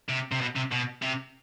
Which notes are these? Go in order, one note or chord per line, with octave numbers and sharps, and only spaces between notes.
C3
C3
B2
C3
B2
C3